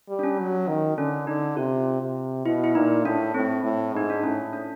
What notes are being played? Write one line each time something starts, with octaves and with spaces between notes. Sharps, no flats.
G3
D4
C#4
F#3
D#3
D3 C#4
D3 D#4
C3 F4
C3
B2 E4
E4
A#2 D#4
A2 D4
A2 C4
A2
G#2 D#4
D4
A2 C#4
D4